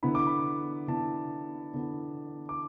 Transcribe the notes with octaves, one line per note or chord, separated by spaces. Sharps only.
D3 B3 E4 B5
D6
B5
D3 B3 E4 A5
D3 B3 E4
D6